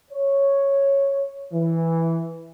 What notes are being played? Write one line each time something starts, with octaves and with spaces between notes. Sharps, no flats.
C#5
E3